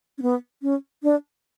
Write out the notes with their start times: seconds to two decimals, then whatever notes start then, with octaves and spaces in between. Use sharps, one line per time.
0.18 C#4
0.22 B3
0.62 C#4
1.03 D4